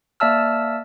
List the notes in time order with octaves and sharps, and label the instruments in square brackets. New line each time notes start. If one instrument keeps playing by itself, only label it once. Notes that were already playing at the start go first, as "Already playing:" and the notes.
[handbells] A#3 D5 E5 A5 E6 F6